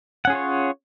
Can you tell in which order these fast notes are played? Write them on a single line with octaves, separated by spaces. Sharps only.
F#5 C#4 G#4 F4 C#5